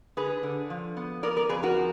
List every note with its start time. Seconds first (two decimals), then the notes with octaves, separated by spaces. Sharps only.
0.17 D3 G#4 B4
0.43 D3
0.70 F3
0.97 B3
1.23 B3 A#4 D5
1.37 A#4 D5
1.49 F2 G#4 B4
1.63 F#4 A#4
1.77 F3